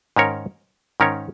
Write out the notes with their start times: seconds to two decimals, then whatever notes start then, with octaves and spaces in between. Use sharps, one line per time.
0.16 G#2 D#3 C#4 A#4 C#5
1.00 G#2 D#3 C#4 A#4 C#5